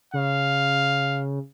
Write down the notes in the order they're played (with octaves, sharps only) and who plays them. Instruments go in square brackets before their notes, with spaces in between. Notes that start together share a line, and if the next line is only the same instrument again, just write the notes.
[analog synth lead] C#3 [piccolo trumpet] F5